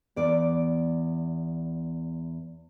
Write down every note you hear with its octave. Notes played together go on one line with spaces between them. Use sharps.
E2 D5